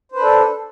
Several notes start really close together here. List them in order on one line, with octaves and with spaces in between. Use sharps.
C5 B4 D4 A4